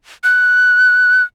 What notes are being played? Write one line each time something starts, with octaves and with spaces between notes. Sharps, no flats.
F#6